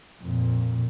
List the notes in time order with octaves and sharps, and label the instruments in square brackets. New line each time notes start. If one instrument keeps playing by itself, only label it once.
[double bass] F2 A#2